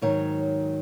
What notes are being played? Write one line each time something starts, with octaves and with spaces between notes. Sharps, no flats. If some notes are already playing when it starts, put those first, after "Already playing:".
G#2 D#3 F#3 C#5